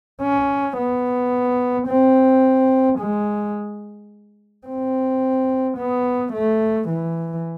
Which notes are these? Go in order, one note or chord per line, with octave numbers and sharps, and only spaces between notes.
C#4
B3
C4
G#3
C4
B3
A3
E3